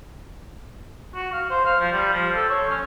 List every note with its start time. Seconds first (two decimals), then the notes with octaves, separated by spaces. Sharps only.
1.15 F#4
1.32 F5
1.50 C5
1.65 F5
1.80 F3
1.92 G3
2.13 F3
2.35 A4
2.50 C#5
2.70 C#4